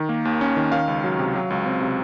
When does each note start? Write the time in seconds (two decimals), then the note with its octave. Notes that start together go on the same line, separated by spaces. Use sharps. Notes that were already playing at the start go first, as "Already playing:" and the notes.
Already playing: D#3
0.09 A#3
0.25 D#2
0.41 C#4
0.56 D#3
0.72 D#3 F5
0.88 C#2
1.04 F#3
1.19 C3
1.35 F#3
1.50 C#2
1.66 C4
1.81 C3